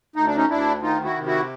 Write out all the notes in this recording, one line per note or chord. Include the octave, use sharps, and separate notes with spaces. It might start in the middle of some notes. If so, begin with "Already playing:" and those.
D2 D#4
D4
C#4 D#4
D2 D4 E4
D#3 D#4 F4
E4 F#4
C3
E4 F#4